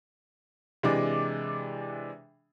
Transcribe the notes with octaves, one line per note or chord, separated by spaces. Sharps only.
C3 E3 G#3 D4 D6